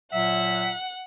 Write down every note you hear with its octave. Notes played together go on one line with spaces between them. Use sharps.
A#2 F#3 E5 F#5